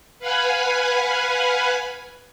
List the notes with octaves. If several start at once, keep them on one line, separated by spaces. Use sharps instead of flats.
B4 F5 F#5 G#5 B5